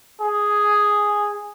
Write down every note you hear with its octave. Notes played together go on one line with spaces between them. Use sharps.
G#4